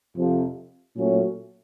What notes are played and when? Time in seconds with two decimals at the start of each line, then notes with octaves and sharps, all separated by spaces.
0.16 F2 C3 F3
0.95 A#2 F#3 A3 C#4